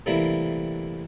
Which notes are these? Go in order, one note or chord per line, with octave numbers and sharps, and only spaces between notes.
C3 E3 G3 A3 A#3 E4